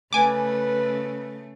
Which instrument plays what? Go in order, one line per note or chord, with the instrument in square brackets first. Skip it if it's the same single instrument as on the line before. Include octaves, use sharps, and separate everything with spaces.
[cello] C#3 A3 [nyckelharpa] B4 [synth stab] G#5 D6